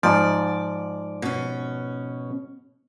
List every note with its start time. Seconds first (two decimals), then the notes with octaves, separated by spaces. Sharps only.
0.03 G#2 F3 D5
1.22 B2 C#4